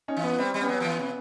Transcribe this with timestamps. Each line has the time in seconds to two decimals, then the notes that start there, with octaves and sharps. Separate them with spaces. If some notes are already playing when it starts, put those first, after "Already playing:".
0.08 C#4 D#4
0.17 E3
0.24 B3
0.38 G3 C4
0.54 G3
0.61 B3 C#4
0.69 F#3
0.80 F3
0.84 E3
0.99 C3